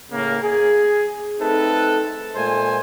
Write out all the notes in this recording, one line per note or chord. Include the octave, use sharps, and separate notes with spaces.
A2 C#3 A#3
G#4
A3 C4 D#4 A4 B4
A#2 G#3 A3 C5 G#5